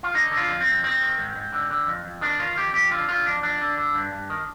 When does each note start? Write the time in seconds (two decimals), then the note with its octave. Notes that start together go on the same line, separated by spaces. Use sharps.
0.03 F4
0.14 D3 D#4
0.31 D3
0.37 F4
0.49 F2
0.61 C4
0.66 F2
0.83 D#3 C4
1.00 D#3
1.19 G#2
1.36 G#2
1.53 D3
1.70 D3
1.87 F2
2.05 F2
2.21 D#3 D4
2.39 D#3 F4
2.57 F2 G4
2.73 F2 G4
2.91 D3 F4
3.09 D3 F4
3.26 F2 D4
3.42 F2 D4
3.61 D3
3.78 D3
3.94 G2
4.12 G2
4.30 D#3